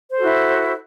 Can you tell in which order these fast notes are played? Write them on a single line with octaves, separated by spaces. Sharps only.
C5 A4 F#4 E4